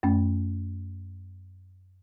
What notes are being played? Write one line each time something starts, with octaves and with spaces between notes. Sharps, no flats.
F#2 A3 C#4